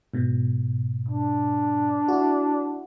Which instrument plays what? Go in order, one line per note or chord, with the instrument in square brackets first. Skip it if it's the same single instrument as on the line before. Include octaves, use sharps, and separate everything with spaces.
[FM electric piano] G#2 B2
[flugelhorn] D4
[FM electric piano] E4 F#4